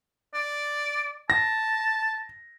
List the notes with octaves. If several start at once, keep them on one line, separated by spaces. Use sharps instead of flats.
D5
A5 A#6